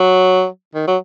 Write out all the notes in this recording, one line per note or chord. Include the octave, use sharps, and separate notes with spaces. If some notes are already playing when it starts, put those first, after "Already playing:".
Already playing: F#3
D#3
F#3